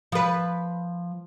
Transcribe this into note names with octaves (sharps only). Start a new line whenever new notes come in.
F3 B4